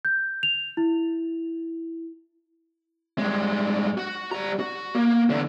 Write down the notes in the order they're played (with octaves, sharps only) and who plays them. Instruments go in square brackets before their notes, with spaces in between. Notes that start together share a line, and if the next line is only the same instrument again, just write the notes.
[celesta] G6
F7
E4
[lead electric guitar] G2 G#3
F#4
G3 A#5
F#4
A#3
E2 D3